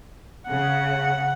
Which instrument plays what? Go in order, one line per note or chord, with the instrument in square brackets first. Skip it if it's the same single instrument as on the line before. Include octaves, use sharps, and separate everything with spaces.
[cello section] C#3 [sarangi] F#5